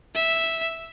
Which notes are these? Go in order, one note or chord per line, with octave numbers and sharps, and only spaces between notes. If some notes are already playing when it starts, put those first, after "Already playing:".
E5